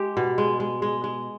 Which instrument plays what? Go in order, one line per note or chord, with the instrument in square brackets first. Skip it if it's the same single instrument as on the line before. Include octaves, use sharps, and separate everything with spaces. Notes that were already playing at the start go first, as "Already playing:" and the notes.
Already playing: [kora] G#3 G4
B2
G#3
G#3
G#3
G#3